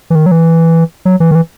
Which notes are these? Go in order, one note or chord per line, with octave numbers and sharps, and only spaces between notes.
E3
D#3
F#3
E3
F#3
E3
D#3
E3